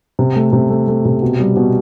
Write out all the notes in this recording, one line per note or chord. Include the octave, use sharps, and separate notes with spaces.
C3
A3
C3
A3
A3
C3
B2
G3
B2